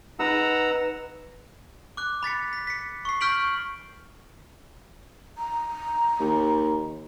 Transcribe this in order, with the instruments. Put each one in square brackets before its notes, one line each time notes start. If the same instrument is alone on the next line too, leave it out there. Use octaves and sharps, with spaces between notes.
[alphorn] D#4 [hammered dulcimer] B4 [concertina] F#5 A#5 E6
[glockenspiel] D6 F#6
B5 A6 B6 C#7
B6
B6 C#7
C#6 C7
C#6 F6 G6 B6 D7 F#7
[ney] A#5
[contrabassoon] D#2